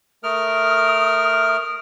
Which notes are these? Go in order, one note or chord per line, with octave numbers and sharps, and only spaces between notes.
A3 A#4 D#6 F6